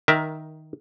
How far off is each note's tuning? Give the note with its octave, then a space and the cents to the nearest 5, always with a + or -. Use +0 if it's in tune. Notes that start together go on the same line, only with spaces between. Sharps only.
D#3 +0 A#4 +20 E5 +0